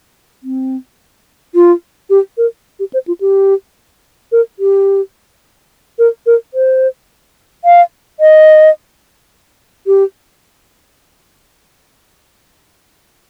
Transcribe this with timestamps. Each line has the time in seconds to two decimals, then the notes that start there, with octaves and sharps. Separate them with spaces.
0.43 C4
1.55 F4
2.10 G4
2.38 A#4
2.80 G4
2.93 C5
3.08 F4
3.21 G4
4.32 A#4
4.59 G4
5.99 A#4
6.26 A#4
6.54 C5
7.65 F5
8.20 D#5
9.87 G4